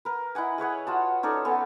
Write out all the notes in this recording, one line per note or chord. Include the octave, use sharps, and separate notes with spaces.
A#4 B4
E4 D#5 F#5 G#5
G#4 B4 C#5 F#5
F4 F#4 A5
C#4 D#4 A4 D5
B3 A4 G#5